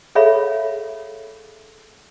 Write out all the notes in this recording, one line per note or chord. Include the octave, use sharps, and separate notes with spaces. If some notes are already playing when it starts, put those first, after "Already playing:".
G#4 A4 C#5 E5 F5 B5